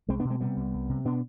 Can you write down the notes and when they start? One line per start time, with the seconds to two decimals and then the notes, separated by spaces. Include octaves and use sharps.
0.08 C2 G#3 C4
0.20 B3 D4
0.25 B2
0.30 G#3 C4
0.41 C3 G3 B3
0.57 C2
0.74 C2
0.89 C3
1.05 B2 B3 D4